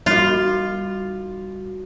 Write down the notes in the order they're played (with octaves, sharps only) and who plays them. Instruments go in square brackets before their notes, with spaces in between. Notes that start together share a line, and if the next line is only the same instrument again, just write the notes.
[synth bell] G3 D#4 F#4 [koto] F4